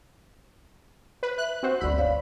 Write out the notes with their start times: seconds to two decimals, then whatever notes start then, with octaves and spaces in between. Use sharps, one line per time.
1.23 B4
1.38 E5 F#6
1.63 C4 F#4 C5
1.80 G1 D2 D5 B5 E6
1.98 C#5 D5 F5